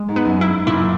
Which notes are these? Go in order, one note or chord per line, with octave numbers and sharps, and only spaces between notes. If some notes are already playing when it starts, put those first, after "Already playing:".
Already playing: G#3
G#2
B3
F#2
G#2 E4
F#2 A#2 E4